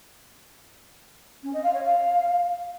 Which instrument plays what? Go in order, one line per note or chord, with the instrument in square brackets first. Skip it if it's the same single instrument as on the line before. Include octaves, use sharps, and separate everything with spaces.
[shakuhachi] C#4
D#5
F5
C#5
F5